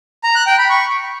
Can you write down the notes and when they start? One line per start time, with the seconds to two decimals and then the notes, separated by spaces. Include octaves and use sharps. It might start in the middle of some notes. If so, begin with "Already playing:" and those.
0.24 A#5
0.35 F#6
0.47 G5
0.58 B5
0.70 C#6